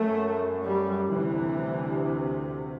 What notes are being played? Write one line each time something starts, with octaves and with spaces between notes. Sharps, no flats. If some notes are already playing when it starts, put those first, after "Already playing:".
Already playing: F#2 A3
G3
D2 C3 E3